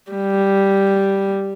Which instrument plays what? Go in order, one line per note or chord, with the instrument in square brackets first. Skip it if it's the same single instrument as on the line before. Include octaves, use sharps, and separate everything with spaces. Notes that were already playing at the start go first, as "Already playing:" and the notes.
[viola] G3